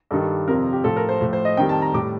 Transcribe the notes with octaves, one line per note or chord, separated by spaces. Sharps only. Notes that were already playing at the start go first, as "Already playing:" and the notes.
G2 D#3 G3 A4
F2 C3 F3 A#4
G4
A2 F3 A4
A#4
C5
A2 F3
C5
D#5
F2 D#3 G3 G5
A5
A#5
A2 G3 D6